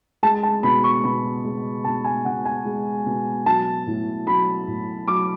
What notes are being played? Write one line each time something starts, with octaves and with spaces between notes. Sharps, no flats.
G#3 A5
A5
B2 B5
C#6
B2 B5
G#3
B2 A5
G#5
B2 F#5
G#5
G#3
B2
F#3 A5
A2
F#3 B5
A2
F#3 D6